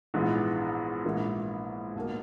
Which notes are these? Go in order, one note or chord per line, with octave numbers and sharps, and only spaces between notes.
A#1 G#2 E3 G#3 B3
A#1 G#2 E3 A#3 E4
B1 B2 A#3